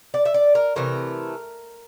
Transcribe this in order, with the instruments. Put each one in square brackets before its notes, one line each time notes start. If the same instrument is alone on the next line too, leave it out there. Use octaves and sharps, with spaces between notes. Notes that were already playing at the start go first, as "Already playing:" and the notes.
[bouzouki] D5
E5
D5
A#4
C3 E3 A3 A#4